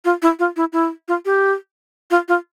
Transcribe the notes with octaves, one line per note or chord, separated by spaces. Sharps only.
F4
E4
F4
E4
E4
F4
G4
F4
F4